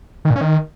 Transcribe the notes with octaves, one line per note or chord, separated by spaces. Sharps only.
D#3
A#2
C#4
D#3